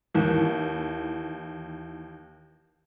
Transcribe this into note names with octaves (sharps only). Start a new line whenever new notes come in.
D#2 E3